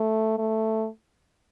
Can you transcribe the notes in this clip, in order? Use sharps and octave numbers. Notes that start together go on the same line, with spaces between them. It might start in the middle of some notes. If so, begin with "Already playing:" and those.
Already playing: A3
A3